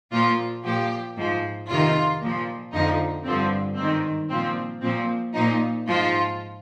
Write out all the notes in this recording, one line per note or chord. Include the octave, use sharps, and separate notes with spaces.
A#2 F3 F4
A#2 F3 G4
G#2 F3
F2 C3 D#3 F4
A#2 F3
F2 D3 F3 D#4
G2 D3 F3 C4
G#2 D#3 C4
A#2 F3 C4
A#2 F3 C4
A#2 F3 D#4
G#2 F3 F4